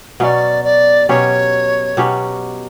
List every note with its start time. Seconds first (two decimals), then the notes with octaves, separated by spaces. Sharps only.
0.20 B2 F#3 C#4 D5 F#5
0.64 D5
1.09 B2 F#3 C#4 G4 C#5
1.97 B2 F#3 C#4 G4